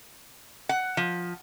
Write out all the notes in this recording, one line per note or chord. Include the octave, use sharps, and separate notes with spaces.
F#5
F3